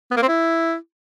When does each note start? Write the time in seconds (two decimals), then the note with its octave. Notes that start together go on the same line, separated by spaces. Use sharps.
0.11 B3
0.17 A#3
0.22 C4
0.28 E4